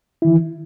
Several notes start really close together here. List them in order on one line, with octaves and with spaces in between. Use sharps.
E4 D#3 E3